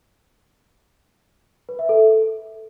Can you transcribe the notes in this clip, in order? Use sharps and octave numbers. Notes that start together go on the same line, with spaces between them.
B4
E5
A4